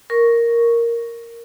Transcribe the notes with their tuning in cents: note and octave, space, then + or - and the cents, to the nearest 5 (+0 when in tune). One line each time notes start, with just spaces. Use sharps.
A#4 +0 C#6 +0